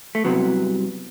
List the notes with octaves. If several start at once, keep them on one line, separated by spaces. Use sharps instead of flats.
A3
C2 C3 F#3 B3